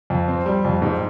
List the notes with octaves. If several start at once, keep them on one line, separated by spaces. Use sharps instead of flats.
F2
C4
G3
F2
G#2